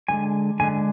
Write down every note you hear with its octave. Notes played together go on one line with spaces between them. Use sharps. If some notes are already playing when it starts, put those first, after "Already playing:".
G2 D3 G#3 G#5
G2 D3 G#3 G#5